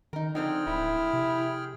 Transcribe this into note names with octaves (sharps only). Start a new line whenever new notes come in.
D#3 D#4 A#4
D3 F3 C4 D#4 G#4 G5 F6
D1 E4
C3